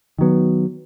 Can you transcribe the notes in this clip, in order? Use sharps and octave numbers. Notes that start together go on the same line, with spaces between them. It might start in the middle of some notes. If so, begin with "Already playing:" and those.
D#3 F#3 B3